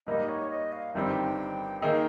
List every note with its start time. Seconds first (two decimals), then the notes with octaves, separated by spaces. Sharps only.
0.07 G#2 G3 A#3 D#4 D#5
0.28 C#5
0.51 D#5
0.72 F5
0.94 G1 G2 D#3 G3 C4 G5
1.81 D#3 A#3 D#4 G#4 G5